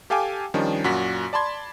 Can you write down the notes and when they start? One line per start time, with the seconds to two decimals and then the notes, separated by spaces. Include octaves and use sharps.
0.10 G4 A4 F5 G5 G#5 D6
0.54 D#3 F3 G3 C#4 D4
0.84 F#2 A#2 F#4 B6
1.33 D5 A5 B5 C6 G#6